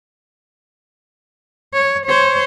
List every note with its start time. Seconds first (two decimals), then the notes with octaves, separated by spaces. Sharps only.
1.73 C#5
2.07 C5 C#5